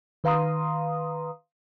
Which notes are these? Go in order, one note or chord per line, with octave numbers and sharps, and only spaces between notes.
D#3 B4 F5 A#5 C6 D#6